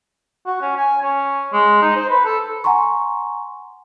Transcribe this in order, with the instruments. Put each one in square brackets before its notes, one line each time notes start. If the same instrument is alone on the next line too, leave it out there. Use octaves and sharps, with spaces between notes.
[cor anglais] F#4
C#4
G#5
C#4
G#3
D#4
C5
B4
A4
[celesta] F#5 G#5 A#5 C6 C#6